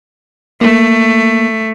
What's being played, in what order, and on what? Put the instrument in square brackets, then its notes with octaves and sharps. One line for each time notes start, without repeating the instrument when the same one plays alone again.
[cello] A3 [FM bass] A#3